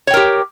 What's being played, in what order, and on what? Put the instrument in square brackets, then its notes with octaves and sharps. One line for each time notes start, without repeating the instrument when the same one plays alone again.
[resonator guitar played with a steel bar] C#5
G5
A#4
G4